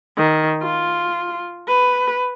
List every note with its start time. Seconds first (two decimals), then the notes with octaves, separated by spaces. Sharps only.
0.17 D#3
0.63 F4
1.68 B4